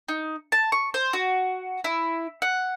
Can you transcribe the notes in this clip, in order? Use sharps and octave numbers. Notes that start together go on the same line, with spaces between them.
D#4
A5
C#6
C5
F#4
E4
F#5